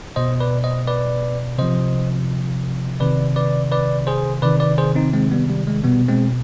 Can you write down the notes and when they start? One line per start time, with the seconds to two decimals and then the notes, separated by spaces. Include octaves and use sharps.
0.16 B2 C5 D#5
0.40 B4 D5
0.64 C5 D#5
0.87 B4 D5
1.58 C3 F3 C5 D#5
3.00 C3 D#3 B4 D5
3.36 B4 D5
3.72 B4 D5
4.07 G#4 C5
4.42 C3 D#3 B4 D5
4.60 B4 D5
4.78 G#4 C5
4.95 C4 D#4
5.13 G#3 C4
5.31 G3 B3
5.50 G3
5.67 G#3
5.84 B2 G3 B3
6.09 G#3 C4